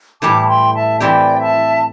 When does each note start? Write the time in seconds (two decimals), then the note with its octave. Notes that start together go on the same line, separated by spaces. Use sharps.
0.21 A2 E3 G3 E4 A5 D6
0.41 D6
0.47 G5 C6
0.74 E5 A5
1.00 E3 C4 E4 G4 D5 G5
1.39 E5 A5